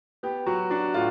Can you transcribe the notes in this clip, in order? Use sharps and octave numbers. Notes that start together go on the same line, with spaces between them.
B3 G4
F#3 F#4
D4 F#4
A2 F4